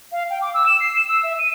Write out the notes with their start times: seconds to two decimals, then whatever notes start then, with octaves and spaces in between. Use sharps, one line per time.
0.12 F5
0.30 G5
0.42 D6
0.54 E6
0.66 E7
0.81 C7
0.96 E7
1.09 E6
1.23 E5
1.39 D#7